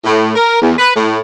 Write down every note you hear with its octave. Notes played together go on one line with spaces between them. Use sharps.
A2
A#4
E2
B4
A2